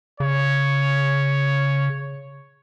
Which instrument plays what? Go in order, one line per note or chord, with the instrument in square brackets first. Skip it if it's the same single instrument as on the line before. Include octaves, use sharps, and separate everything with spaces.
[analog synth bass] C#3 [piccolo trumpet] C#5